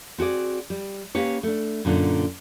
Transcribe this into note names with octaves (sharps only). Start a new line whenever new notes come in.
C4 F#4 G#4 D5
G3
A#3 C#4 G4 B4 C#5
A3 D4
F#2 A#2 D3 D4